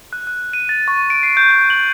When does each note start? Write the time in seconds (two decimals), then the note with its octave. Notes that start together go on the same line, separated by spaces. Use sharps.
0.13 F#6
0.27 F#6
0.53 D#7
0.69 A6
0.88 C#6
1.10 D7
1.23 C7
1.37 G6
1.51 G6
1.70 F#7